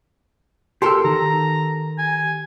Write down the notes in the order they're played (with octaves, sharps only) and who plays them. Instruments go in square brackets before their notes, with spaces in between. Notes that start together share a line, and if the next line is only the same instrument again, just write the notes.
[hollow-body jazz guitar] G4 A4 A#4 [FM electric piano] C6 E6
[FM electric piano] D#3 [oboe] A#5
[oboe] G#5